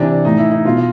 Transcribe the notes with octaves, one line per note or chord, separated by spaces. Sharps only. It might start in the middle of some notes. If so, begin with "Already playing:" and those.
Already playing: C3 E3 D4
A2 E3 D#4
E4
D#4
B2 F4